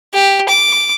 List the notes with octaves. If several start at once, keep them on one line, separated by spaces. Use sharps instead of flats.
G4
D6